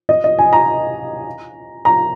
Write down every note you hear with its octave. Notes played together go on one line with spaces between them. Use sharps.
D#5
D#5
G#5
A#5
A#5